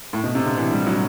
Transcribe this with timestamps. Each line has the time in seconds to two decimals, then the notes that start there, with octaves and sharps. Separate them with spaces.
0.13 A2
0.24 B2
0.35 C3
0.46 D3
0.57 E3
0.72 G3
0.87 F#3